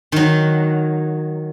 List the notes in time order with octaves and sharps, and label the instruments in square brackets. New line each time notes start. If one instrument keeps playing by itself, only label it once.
[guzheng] D#3 F#3